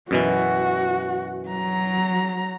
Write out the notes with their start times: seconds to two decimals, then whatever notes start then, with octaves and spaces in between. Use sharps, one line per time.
0.11 F#2 B2 E3 F#4
1.49 F#3 A#5